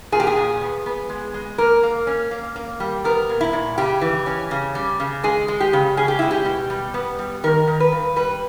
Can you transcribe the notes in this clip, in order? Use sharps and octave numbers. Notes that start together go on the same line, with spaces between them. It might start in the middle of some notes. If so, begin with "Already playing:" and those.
A#2 G#4
G4
G#4
A#2
B3
B3
G#3
G#3
A#3 A#4
A#3
C#4
A#3
A#3
G3
B3 A#4
A#2
E4
A#2
C#3 G4
E3
C#4
C#3
G3
C#3
G#3 G#4
G#3
G4
C#3
C#4 G#4
G4
G#3 E4
G4
B2
G3
B3
G3
D#3 A#4
D#3
B4
G2
G3 B4